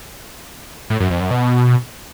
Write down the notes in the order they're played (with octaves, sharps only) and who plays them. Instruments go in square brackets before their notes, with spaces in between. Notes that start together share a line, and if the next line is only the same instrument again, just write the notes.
[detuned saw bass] A2
F#2
F2
F#2
B2